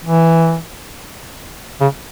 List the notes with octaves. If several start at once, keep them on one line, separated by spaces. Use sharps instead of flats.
E3
C#3